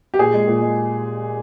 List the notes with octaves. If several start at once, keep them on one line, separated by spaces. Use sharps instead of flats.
G4
A#2 G#4
G#3
A#2
G#3